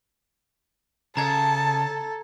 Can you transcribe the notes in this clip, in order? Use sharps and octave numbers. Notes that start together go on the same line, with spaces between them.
C#3 A4 A5 A#5 G#6